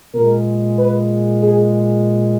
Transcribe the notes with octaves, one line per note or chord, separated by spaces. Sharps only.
A#2 G#3 A#4
B4
G#4